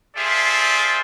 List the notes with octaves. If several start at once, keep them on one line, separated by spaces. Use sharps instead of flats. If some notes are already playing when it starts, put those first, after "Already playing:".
F4 G#4 A4 C5 D5 E5